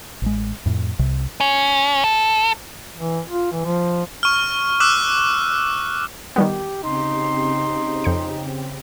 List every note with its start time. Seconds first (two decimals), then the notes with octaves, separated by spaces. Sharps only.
0.22 A1 G#3
0.66 F2 A2
0.99 C2 C3
1.40 C#4
2.04 A4
2.98 E3
3.28 F4
3.52 E3
3.65 F3
4.23 C#6 F6
4.80 D6 E6 F#6
6.36 D#3 G3 B3 G4
6.83 C#3 C4 D#4 G4 C6
8.04 F2 G6 C#7